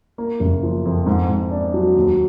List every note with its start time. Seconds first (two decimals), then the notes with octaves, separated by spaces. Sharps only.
0.18 A#3
0.40 F#1
0.63 F3
0.85 F2
1.06 G#2
1.29 G#2
1.51 D4
1.74 F#3
1.96 D#2